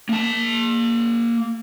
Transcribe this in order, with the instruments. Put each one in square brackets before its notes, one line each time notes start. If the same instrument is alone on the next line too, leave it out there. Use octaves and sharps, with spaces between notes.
[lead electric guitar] A#3 A5